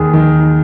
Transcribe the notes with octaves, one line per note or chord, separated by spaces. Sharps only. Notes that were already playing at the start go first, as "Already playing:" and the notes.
Already playing: D#2 G#4
D#3